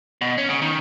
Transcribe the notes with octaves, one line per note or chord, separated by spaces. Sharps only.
B2
C#4
C#3
D#3